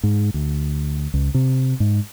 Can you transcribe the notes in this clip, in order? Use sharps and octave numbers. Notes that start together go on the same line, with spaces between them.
G#2
D2
C#2
C3
G#2